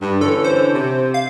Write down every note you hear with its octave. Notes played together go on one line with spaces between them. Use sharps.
G2
D3 E3 C#4 A4
C5
C3
F5